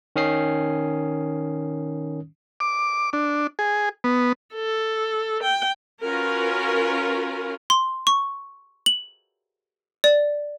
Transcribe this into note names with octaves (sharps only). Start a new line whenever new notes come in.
D#3 C#4 D#6 C7
D6
D4
G#4
B3
A4
G5
C#4 F4 F#4 A#4 B4
C6
C#6
F#7
D5